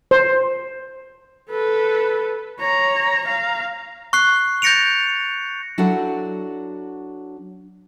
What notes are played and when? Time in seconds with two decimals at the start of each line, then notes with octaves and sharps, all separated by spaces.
0.11 C5
1.50 A4 B4
2.59 C#5 A#5
3.25 F5 A#5
4.13 C#6 F#6 C7
4.62 G6 A6 A#6 C#7 D7 F7
5.78 F#3 D4 E4 F#4 A4 F#5